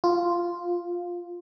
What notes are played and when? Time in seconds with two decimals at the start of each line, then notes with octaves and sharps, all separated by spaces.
0.04 F4